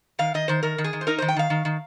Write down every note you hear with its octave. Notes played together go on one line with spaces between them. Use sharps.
D#3 F5
D#3 D#5
D#3 C5
D#3 A#4
D#3
G#4
D#3
C5
D#4 A#4
D#3 C5
G5
D#3 F5
D#3
D#3